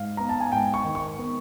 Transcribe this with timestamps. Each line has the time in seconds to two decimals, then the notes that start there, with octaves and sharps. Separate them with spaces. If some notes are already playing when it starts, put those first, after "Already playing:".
Already playing: G#2 F5
0.17 B3 A#5
0.29 A5
0.40 G#5
0.51 G#2 G5
0.74 C#6
0.84 D#3
0.95 C#6
1.17 B3